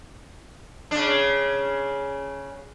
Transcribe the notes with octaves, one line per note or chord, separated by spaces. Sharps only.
C#3 D4